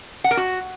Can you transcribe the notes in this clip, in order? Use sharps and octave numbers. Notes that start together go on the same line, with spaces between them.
F#5
A#4
F#4